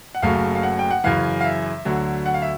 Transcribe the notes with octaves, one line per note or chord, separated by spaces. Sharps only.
F#5
F#1 F#2 C#3 F#3 A3 F5
F5
F#5
G5
F#5
F#2 C#3 E3 F5
F5
E5
D2 D3 F#3
F#5
F5
E5